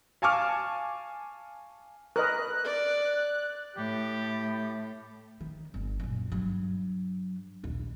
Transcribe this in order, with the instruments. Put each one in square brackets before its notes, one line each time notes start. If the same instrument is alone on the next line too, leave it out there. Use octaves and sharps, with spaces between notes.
[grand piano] F5 G#5 A5 C#6 D6 F6
[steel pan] A#4 B4 D#5 [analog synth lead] F#6
[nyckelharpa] D5
[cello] A2 [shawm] G4
[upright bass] D#3
G1
F#2 A#2
G2 F#3
A#1 D#2